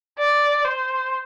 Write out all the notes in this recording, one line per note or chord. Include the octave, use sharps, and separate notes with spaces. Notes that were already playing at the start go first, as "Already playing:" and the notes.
D5
C5